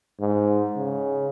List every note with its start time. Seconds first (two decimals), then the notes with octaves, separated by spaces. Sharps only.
0.20 G#2
0.76 C#3